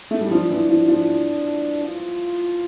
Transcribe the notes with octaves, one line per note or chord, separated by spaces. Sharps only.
A3
G3
F3 D4
E3
F3
F3
F4